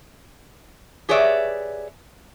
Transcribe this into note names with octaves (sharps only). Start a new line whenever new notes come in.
G4 G#4 B4 C#5 D5 E5